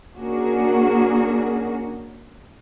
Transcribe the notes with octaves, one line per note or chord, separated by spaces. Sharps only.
A#3 C#4 D4 F#4 G#4 A#4